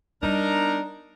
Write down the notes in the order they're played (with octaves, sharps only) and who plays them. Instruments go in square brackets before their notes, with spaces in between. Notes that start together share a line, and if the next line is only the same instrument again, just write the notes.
[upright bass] G3 B3 [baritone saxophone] D4 [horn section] D#4 A#4